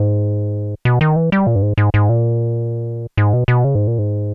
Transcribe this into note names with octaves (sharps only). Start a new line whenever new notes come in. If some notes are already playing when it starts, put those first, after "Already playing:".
Already playing: G#2
B2
D#3
E3
G3
A#2
G2
G#2
G#2
G#2
A#2
G#2
B2
B2
C#3
G#2
A#2
G#2